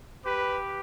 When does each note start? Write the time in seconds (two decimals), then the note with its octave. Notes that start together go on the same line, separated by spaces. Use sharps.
0.25 G4 B4